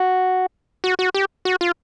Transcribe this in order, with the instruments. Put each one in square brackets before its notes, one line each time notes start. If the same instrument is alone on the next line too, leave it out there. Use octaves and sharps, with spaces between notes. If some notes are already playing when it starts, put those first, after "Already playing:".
Already playing: [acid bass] F#4
F#4
F#4
G4
F#4
F4